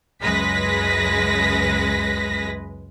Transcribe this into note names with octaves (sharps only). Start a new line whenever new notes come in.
C#2 F#2 G#3 B4 A#6 B6